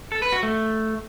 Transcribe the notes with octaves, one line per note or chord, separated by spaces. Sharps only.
A4
B4
F#4
A3